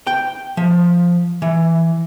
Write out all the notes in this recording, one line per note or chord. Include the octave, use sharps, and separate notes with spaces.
G5
F3
E3